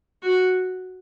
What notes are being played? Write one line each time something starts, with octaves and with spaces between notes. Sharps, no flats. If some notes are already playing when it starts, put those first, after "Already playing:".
F#4